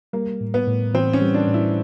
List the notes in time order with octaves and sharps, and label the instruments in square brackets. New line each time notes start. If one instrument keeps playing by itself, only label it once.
[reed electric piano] G3 [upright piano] A#3
[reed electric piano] A2
[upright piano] B3
[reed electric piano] A2
[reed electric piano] E3 [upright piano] C4
[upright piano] C#4
[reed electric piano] G3
[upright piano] D4
[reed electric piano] A2
[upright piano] E4